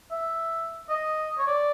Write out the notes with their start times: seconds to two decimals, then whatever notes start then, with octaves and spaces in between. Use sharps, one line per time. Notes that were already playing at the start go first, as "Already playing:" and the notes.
0.11 E5
0.89 D#5
1.38 C#5
1.47 D5